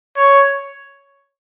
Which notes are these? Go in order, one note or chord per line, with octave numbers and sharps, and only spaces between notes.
C#5